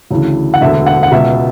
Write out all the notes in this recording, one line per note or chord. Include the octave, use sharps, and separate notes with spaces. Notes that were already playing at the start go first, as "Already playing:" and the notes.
D2 C#3 E3
F#5
E1 D2 D3 E5
F#5
F#5
C#2 B2 E5